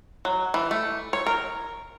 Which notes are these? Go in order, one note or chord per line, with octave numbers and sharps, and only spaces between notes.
F#3
E3
A3
C#5
A#4